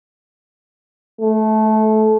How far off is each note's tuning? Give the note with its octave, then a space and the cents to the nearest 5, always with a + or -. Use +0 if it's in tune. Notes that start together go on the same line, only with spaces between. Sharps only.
A3 -20